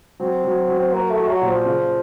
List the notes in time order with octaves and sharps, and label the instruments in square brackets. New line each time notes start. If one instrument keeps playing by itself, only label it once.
[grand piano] F#3 [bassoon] C4
[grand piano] F#3
F#3
[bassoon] C4
[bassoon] A#3 [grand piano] F#4
[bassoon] A3
[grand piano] F#4
[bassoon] F#3
[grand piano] A#2
[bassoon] F3
[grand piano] C#3